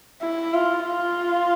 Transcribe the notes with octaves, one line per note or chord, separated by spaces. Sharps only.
E4
F4
F4